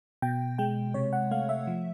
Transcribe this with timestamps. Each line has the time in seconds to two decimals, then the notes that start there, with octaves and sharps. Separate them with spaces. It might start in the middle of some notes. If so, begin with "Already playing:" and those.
0.22 B2 G5
0.58 G#3 G5
0.94 C3 C#5
1.13 F#5
1.31 A3 F5
1.49 E5
1.67 F3